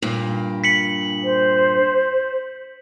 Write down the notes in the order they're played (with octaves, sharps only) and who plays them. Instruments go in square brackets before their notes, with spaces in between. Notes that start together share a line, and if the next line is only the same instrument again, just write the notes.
[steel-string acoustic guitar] G2 A#2
[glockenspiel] B6 C#7 F#7
[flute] C5